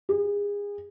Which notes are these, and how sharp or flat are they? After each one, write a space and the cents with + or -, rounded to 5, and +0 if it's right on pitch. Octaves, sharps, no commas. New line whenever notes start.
G#4 -30